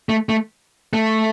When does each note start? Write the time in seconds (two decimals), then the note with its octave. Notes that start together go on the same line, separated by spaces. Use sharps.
0.09 A3
0.29 A3
0.93 A3